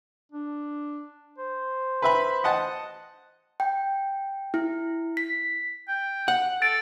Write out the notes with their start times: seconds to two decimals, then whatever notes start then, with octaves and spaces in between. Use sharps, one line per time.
0.32 D4
1.38 C5
2.02 B4 E5 B5
2.44 D#5 F#5 A5
3.60 G5
4.54 E4
5.17 B6
5.88 G5
6.28 F#5
6.62 A4 A6 D7